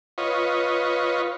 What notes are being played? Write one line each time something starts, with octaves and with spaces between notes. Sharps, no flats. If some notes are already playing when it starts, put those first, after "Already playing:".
F4 B4 C#5 D#5